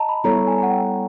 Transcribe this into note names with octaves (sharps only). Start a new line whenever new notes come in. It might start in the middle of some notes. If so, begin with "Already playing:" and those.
Already playing: D#5 A5 A#5
B5
G3 B3 E4 A4 C#5 A#5
G#5
F#5
G5